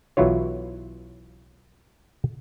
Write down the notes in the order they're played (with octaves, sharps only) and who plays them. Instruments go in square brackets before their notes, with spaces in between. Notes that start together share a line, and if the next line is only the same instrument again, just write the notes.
[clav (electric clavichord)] B1 E3 F#3 E4 F4 C#5